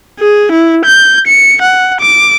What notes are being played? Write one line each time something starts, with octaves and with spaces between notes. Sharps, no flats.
G#4
E4
G6
C#7
F#5
D6